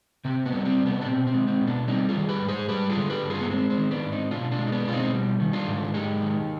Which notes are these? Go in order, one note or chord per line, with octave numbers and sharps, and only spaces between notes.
C3 C4
B3
G3
C4
C3
B3
D4
B2 C4
C4
G#3
C4
B2
B3 D4
G3 C4 D#4
F4 G#4
D#3
G4 B4
G#2
G#4 C5
G3 G4 B4
F4 G#4
D3
G4 B4
G2
F4 G#4
B3
G#3 C4
C4
D#3
B3 D4
G#2
C4 D#4
B2 D4 F4
D4 F4
G#3
D#4
B3 D4
B2 F4
C4 D#4
G3
D#3
D4 F4
G#2
G#3 D#4 G4
D#3